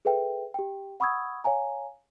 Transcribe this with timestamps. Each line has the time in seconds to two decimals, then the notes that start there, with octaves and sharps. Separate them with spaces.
0.05 G#4 A4 B4 E5 G5
0.54 G4 G5
1.00 F#5 B5 C#6 D#6 E6 G#6
1.44 C#5 F5 G#5 A#5